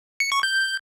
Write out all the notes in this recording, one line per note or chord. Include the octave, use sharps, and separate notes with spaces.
C#7
C#6
G6